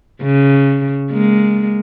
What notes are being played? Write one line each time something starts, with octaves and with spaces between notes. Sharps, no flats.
C#3
G#3 A#3